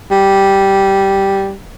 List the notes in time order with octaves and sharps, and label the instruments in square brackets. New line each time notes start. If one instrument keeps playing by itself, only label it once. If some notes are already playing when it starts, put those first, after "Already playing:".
[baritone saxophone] G3